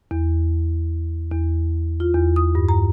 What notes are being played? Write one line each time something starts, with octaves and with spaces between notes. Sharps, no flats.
E2
E2
F4
E2
D#6
G2
A#5